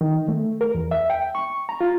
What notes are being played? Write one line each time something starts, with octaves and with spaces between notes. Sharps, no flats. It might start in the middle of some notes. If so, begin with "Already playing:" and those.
D#3
A3
A#4
E2
E5
G5
C#6
A#5
F4